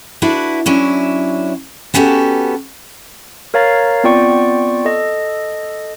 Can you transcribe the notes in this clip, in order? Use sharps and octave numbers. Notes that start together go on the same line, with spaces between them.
D4 E4 F#4 B4
F#3 C#4 D4 E4
B3 C#4 F#4 G4 A4
A#4 C#5 F5 A#5 A6
B3 C4 F4 D5 G5 C#6
A4 D#5